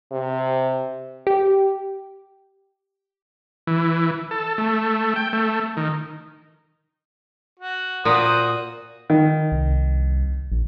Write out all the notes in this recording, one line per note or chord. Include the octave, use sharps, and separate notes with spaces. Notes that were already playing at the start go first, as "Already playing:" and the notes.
C3
G4
E3
A4
A3
G5
A3
D#3
F#4
A#2 F#4 C5 D#6
D#3
C2
A#1